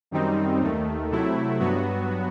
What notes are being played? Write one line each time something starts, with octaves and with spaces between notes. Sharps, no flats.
F#2 D#3 G3 C4 D#4
D#2 D#3 A3
C3 F#3 A3 E4
G2 F#3 B3 F#4